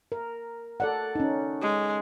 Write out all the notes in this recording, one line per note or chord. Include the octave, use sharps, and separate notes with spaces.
A#4
A4 D5 F#5
C#4 D#4
G#3